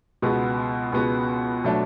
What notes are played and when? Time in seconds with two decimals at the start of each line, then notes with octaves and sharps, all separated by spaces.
0.22 C#2 B2 G#3 B3 F#4
0.92 C#2 B2 G#3 B3 F#4
1.64 B2 F#3 A3 D4